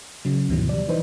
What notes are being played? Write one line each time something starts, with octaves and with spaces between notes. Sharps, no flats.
C#3 F#3
D2 G#2 B2 D#3 E3 F#3
G3 D5
D#3 E3 D#4 B4 C5